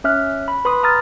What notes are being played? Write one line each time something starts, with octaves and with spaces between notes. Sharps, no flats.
C#4 E5 F6 F#6
B5
B4 B5 C6 D#6
A#5 D#6 F6 A6